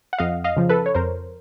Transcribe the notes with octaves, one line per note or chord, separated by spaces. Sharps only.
F#5
F2 D#5 F5
D#5 F5
C#3 F3
A4 B4
C#5
F2 A#4 C5